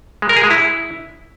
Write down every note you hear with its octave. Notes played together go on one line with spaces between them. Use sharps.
G#3
A#4
G#4
G#3
E4